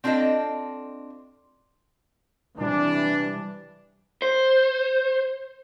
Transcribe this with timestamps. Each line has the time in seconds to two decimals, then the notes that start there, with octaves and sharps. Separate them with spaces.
0.04 C4 D4 F4 A4 D#5
2.58 C3 E3 G3 D4
4.22 C5